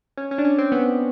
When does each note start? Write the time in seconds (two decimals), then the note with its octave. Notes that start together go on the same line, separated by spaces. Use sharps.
0.17 C#4
0.31 C#4
0.38 D4
0.44 C#4
0.58 C4
0.72 B3